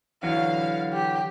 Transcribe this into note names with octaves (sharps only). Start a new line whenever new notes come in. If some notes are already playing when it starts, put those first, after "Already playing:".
D3 E3 F#3 F5
G4